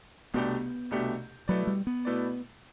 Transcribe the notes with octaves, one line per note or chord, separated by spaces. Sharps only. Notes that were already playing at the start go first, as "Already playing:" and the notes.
C2 B2 A3 B3 D4 G4
C2 B2 A3 D4 G4
B2 F#3 A3 E4 B4 D5
G3
B3
B2 A3 E4 B4 D5